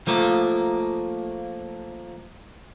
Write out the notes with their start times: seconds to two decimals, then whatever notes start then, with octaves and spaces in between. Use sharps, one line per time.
0.07 F3 A3 A#3